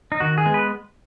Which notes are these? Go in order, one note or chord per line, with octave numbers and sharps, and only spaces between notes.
D#4
D#3 F#4
G#4
G#3 B3
B4